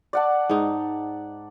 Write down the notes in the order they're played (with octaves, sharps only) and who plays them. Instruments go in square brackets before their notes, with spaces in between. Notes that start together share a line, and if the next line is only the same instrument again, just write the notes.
[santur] D5 F#5 A5
[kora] G#2 D#4